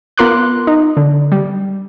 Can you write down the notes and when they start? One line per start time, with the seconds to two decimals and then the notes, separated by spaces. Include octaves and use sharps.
0.18 B3 F4 A#4 C6 D6 F#6
0.67 D#4
0.97 D3
1.32 G3